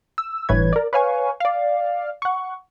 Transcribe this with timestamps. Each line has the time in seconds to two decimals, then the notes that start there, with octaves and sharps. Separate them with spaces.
0.18 E6
0.49 G1 A2 E3 B4 C#5 G#6
0.73 A#4 D5
0.93 B4 C#5 F5 G#5 C#6
1.40 D5 F5
2.22 F#5 C#6